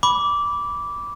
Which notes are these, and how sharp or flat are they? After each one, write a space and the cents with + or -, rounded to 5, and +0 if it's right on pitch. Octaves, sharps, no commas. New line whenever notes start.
B5 -5 D6 -15